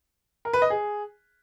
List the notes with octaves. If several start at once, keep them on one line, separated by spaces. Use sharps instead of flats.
A#4
B4
D#5
G#4